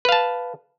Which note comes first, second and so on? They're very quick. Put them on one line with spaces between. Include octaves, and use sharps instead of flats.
B4 F5 A5